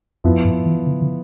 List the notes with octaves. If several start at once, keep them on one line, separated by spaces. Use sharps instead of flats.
F2 F3 B3 E4
G2
E3
D3
D3